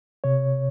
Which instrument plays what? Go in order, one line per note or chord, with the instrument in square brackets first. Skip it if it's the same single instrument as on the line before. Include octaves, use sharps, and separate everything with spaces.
[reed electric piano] C3 C#5